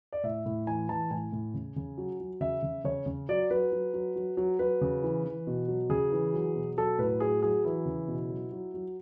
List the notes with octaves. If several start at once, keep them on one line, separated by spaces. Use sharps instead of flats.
D5
A2 E5
A2
E3 G#5
E3 A5
A2 G#5
A2
C#3
C#3
F#3
F#3
C#3 E5
C#3
C#3 C#5
C#3
F#3 D5
F#3 B4
F#3
F#3
F#3
F#3
F#3 B4
C#3
E3
E3
B2
F#3
C#3 G#4
E3
F#3
B2
F#3 A4
A2 B4
F#3 G#4
F#3 G#4
E3 E4
C#3
B2
F#3
F#3
F#3